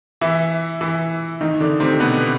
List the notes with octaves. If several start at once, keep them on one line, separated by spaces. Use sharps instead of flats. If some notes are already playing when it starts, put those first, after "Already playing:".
E3 E4
E3 E4
D#3 D#4
D3 D4
C3 C4
B2 B3